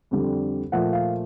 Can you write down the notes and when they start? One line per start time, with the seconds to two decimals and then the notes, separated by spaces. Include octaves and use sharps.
0.11 F2 D3 G3
0.72 A#2 F3 A3 F#5
0.93 F5